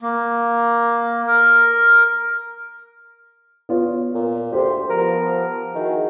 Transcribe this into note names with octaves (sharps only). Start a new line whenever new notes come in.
A#3
A#4
B3 F4 C#5
A#2
D2 G4 C5
F3 B3 A#4
D#3 E4 F#4 G#4